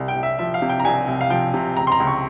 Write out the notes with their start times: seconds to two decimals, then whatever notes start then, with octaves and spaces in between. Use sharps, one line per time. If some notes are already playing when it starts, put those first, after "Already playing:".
Already playing: C2
0.08 G5
0.16 C2
0.23 E5
0.39 F3 E5
0.54 F5
0.62 C3
0.69 G5
0.80 A#5
0.84 C2 G#5
1.08 C2
1.21 F5
1.30 F3 G5
1.54 C3
1.77 C#2 A#5
1.87 C6
1.92 A#5
2.00 C#2
2.07 C#6